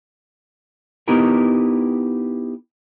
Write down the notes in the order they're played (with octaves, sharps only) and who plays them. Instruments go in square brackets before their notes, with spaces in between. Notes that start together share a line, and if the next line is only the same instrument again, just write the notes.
[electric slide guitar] B3 D#4 E4 G4 A#4 B4